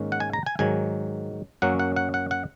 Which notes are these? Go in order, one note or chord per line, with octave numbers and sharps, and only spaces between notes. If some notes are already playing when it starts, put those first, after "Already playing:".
Already playing: G#2 D#3 A#3 C#4
F#5
G#5
A#5
G#5
G#2 D#3 F#3 G#5
F#2 F#3 A#3 C#4 F#5
F#5
F#5
F#5
F#5